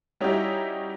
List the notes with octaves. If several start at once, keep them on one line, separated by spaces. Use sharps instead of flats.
G3 C#4 D#4 E4 F#4 G4